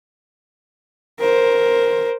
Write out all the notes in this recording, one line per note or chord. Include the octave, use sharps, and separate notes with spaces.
A#4 C5